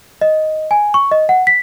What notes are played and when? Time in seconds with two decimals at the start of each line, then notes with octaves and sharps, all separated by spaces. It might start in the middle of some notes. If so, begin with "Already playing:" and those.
0.21 D#5
0.71 G#5
0.94 C#6
1.12 D#5
1.29 F#5
1.47 B6